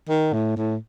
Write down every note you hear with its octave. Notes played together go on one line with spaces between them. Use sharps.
D#3
A2
A2